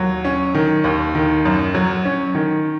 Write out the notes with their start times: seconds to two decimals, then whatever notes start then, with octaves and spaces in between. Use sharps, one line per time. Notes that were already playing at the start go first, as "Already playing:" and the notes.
Already playing: D#2 F#3
0.25 C#4
0.55 D#3
0.84 D#2
1.15 D#3
1.45 F#2
1.75 F#3
2.05 C#4
2.35 D#3